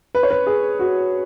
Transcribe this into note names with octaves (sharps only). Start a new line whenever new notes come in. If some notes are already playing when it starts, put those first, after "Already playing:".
B4
C#5
B4
G#4
F#4